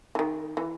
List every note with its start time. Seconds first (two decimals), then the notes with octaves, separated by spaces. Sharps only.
0.15 E3
0.19 D#3
0.57 E3